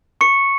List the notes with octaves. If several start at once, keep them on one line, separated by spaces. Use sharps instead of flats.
C#6 C#7